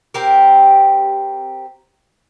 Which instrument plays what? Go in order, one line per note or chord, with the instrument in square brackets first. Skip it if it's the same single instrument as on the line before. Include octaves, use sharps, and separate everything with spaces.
[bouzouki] C4 G4 A#4